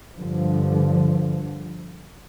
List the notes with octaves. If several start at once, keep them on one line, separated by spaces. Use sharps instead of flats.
G2 D3 F3